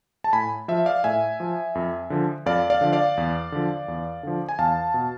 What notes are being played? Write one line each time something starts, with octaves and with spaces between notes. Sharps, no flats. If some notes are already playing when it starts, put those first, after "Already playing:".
A5
A2 G#5 B5
F3 E5
D5 F5
A2 E5 G#5
F3
F2
D3 F3
F2 D5 F5
D5 F5
D3 F3
D5 F5
E2
D3 F3
E2
D3 F3
G#5
E2 F5 A5
B2